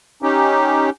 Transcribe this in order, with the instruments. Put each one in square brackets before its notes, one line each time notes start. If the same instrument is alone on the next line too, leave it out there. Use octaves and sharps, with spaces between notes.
[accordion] C#4 D#4 G4